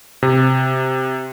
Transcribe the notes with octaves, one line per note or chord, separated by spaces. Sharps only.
C3